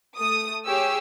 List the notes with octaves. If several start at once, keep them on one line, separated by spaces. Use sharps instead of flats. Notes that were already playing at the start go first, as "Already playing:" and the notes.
A3 D#6
G4 G#4 C#5 E6